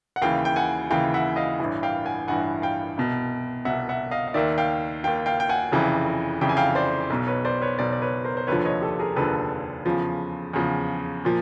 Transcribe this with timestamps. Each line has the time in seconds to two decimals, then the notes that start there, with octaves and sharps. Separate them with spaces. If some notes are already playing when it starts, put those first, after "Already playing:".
0.16 F#5
0.22 D#2 C#3 E3 F5 G5
0.45 G5
0.56 F#5 G#5
0.90 D#2 C#3 E3 F5 G5
1.14 E5 F#5
1.36 D#5 F5
1.59 A1 G2 E3
1.83 F5 G5
2.05 F#5 G#5
2.28 A1 G2 E3 F#5 G#5
2.62 F5 G5
2.97 C2 B2
3.65 C2 B2 E5 F#5
3.89 E5 F#5
4.11 D#5 F5
4.27 F5
4.34 D#2 D#3 D5 E5
4.58 F5 G5
5.04 D#2 D#3 F5 G5
5.26 F5 G5
5.40 G5
5.49 F#5 G#5
5.72 F1 F2 C#3 E3
6.41 F1 F2 C#3 E3 G5
6.49 G#5
6.57 F5 G5
6.75 C5 D5
7.10 B1 B2
7.27 B4 C#5
7.45 C5 D5
7.62 B4 C#5
7.78 B1 B2 C5 D5
7.92 D5
8.02 B4 C#5
8.24 A#4 C5
8.37 C5
8.47 F1 D#2 D3 F3 B4 C#5
8.65 C#5 D#5
8.81 G4 A4
8.99 G#4 A#4
9.16 F1 D#2 D3 F3 A4 B4
9.86 E2 C#3 F3
10.53 E2 C#3 F3
11.25 A#2 F3